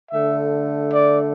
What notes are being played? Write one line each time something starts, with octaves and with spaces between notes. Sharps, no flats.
D3 A3 E5
D5